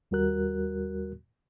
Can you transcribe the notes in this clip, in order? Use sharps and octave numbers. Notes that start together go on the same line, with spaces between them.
D#2 G3 F#4 A#4 F#6